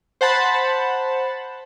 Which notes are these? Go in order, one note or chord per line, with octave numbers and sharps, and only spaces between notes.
C5 F#5 A5 B5